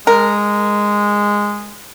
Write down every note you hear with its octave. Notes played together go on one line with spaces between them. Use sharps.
G#3 A#4